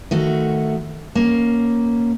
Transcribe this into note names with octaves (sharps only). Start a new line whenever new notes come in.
D#3 A3 F#4
A#3 C#4